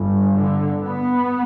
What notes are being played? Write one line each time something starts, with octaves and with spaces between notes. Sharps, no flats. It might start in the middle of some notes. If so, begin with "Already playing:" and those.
Already playing: G1 G2
D3
B3